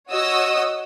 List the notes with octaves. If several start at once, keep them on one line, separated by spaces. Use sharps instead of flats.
F#4 C#5 D#5 D#6 E6